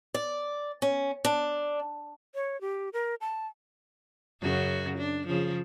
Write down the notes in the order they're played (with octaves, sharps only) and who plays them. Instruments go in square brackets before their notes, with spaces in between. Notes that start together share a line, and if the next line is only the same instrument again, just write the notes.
[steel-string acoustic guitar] D5
C#4
D4
[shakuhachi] C#5
G4
A#4
A5
[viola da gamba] F#2 C#3 F#4
D4
C#3 F3